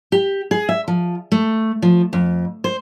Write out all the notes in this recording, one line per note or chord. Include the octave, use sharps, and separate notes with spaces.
G4
G#4
E5
F3
A3
F3
F2
C5